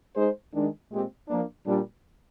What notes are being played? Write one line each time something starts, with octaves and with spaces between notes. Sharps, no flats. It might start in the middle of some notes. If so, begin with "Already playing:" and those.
G#3 D#4 G#4 C5
D#3 G#3 D4
A#2 G#3 C4 G4
F3 A#3 D4
A#2 G3 D4